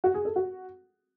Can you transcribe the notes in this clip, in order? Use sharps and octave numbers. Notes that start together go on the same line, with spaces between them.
F#4
G#4
A4
F#4